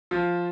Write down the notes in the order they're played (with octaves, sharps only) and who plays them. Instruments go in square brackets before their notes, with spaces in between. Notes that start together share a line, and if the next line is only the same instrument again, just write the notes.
[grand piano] F3 F4